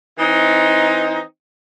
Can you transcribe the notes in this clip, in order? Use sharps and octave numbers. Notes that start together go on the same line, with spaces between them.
E3 C4 D#4